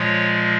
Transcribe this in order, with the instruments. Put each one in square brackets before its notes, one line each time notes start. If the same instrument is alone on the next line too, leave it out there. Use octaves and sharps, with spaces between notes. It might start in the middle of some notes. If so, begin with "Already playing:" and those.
Already playing: [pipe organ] A#2 F3 G#3 C#5